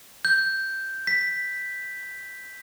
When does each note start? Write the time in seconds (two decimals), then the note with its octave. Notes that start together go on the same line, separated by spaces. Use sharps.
0.25 G6
1.07 B6